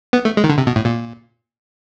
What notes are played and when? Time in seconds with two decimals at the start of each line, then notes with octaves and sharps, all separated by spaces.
0.13 B3
0.25 A3
0.37 G#3
0.44 D#3
0.49 D3
0.58 C3
0.67 B2
0.76 A2
0.85 A#2